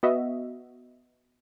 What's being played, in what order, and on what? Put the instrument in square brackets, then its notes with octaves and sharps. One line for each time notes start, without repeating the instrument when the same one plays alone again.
[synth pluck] B3 F#4 D#5 E5